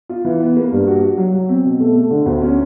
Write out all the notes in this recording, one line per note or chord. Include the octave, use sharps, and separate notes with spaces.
F4
E3
B3
A#3
G2
F#4
F#4
F#3
F#3
C4
B2
A3
A3
D3
D2
C#4